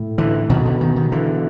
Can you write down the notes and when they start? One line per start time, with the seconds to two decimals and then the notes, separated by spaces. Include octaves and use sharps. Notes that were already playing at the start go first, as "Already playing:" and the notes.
Already playing: A2
0.18 D3 E3
0.50 B2 D#3
0.65 D3
0.81 D#3
0.96 D#3
1.12 D3 E3